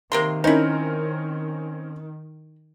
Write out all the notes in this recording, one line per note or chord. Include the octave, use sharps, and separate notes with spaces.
C3 D#3 A#3 C6
C4 C#4 D#4 E4 A#4